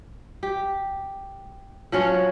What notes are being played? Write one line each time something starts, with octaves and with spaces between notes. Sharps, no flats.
G4
F3 F#3 C#4